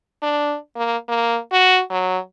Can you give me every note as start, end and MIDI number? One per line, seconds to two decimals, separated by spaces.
0.23 0.56 62
0.76 0.96 58
1.08 1.38 58
1.52 1.81 66
1.91 2.18 54